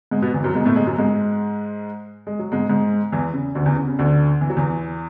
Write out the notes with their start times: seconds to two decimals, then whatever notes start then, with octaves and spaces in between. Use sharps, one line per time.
0.11 G#2 G#3
0.22 B2 B3
0.34 E2 E3
0.44 F#2 F#3
0.55 G#2 G#3
0.65 A2 A3
0.76 G#2 G#3
0.87 F#2 F#3
0.98 G#2 G#3
2.27 G#3
2.39 F#3
2.52 G#2 G#3
2.69 G#2 G#3
3.12 E2 E3
3.34 C#3
3.55 D2 D3
3.66 E2 E3
3.76 C#3
3.88 C#3
3.99 D2 D3
4.41 E3
4.50 F#3
4.57 E2 E3